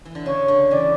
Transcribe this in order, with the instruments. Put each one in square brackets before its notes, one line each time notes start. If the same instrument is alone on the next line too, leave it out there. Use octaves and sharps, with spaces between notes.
[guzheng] E3
D3
[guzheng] C#3 [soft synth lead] C#5
[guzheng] D3
[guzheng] C#3 E3 [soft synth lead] D5